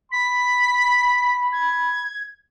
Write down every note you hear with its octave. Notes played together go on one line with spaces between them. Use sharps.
B5 B6
G#6